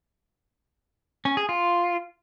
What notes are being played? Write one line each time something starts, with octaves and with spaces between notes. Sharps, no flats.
C#4
G#4
F4